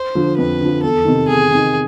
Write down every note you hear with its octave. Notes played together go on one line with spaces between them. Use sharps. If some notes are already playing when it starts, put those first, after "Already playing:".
Already playing: C5
D3 F3
F2 B4
D3 F3
E2 A4
C3 D#3
E2 G#4
C3 D#3